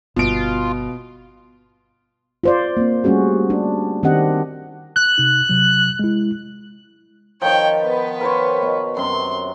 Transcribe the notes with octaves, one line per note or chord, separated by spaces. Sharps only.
G1 B2 F4 D7
F4 C5 D5
A#3 C4
G3 A3 C#4 F#4 G#4
D4
D#3 C4 D4 G4 D#5 F#5
F#6
C3 D#4
C3 F#3
G#3 E4
D#3 F3 C#5 G5
B3 B4
A#4 C5 C#5
B2
F#2 C3 C6